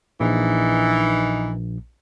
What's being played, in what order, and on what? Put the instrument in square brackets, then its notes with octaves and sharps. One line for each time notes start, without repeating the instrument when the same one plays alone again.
[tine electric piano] A#1 [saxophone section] E3 D#4